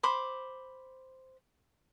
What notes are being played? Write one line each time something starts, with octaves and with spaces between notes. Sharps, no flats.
C5 B5 D6